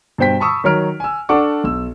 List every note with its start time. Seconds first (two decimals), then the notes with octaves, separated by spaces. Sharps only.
0.18 G2 B2 C5 G5 B6
0.40 A5 B5 C#6 D#6 E6
0.64 D#3 F#3 C#5 A#5 F6 D7
1.00 G#5 E6
1.29 D4 A4 F#5 C#6 D6
1.64 B1 E6